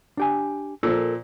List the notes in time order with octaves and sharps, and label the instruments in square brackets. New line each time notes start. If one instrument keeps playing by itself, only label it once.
[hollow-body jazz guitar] D4 G4 G#5
[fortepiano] A#2 F3 [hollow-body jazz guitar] A4 A#4